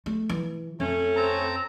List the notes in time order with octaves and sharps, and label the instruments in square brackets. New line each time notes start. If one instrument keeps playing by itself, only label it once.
[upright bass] A3
E3
[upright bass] F2 [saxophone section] A3 C#4
[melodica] C4 A5 A#5